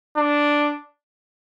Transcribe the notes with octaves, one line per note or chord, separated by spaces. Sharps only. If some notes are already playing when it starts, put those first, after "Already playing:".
D4